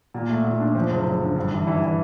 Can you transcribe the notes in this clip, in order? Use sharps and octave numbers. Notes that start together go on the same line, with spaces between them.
A#2
A3
A#2
D4
F3
F#1
F#1
D3
G2
E3
E3
E3